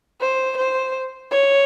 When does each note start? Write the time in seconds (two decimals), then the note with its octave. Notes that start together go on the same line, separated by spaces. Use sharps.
0.21 C5
0.57 C5
1.31 C#5